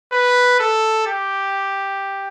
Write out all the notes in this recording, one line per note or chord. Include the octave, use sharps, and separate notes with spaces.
B4
A4
G4